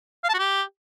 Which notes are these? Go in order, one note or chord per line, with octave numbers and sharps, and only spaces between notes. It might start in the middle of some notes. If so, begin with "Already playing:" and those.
F5
A5
F#4
G4